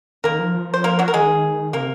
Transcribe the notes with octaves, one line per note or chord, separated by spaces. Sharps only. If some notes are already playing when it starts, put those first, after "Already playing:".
D#3 A#3 A#4
F3
F3
C5
A#3 A#4
F#3 F#4
A#4
D#3 G#3 G#4
C3 A#3 A#4